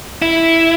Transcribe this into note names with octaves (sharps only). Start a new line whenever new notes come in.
E4